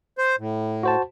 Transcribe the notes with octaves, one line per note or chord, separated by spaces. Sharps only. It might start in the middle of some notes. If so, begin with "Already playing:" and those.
C5
A2
F#4 C5 A5